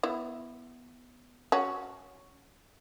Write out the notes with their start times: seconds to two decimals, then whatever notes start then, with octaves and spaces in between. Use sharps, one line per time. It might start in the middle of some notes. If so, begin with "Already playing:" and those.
0.03 B3 E4
1.52 C#4 F#4